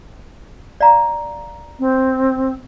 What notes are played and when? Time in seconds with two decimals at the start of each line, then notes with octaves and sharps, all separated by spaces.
0.81 D5 F5 A#5
1.80 C4